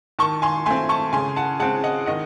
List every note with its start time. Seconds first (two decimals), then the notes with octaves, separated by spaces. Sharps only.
0.19 D#3 A5 C#6
0.42 G#5 C6
0.66 A3 C4 G#5 C6
0.89 A5 C#6
1.13 C#3 G#5 C6
1.36 F#5 A5
1.59 G#3 C4 F#5 A5
1.84 D#5 F#5
2.06 D#3 D#5 F#5